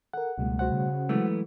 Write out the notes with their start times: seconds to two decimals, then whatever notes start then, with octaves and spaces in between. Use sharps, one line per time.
0.13 A4 A#4 F#5
0.38 C#2 B2 G3 A3
0.59 F#4 C5 F#5
0.72 C#3
1.09 E3 F#3 G#3 A3 B3